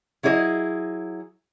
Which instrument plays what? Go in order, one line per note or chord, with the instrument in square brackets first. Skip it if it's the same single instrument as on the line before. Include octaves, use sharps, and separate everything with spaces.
[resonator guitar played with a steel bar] F#3 E4 G#4 C#5 D#5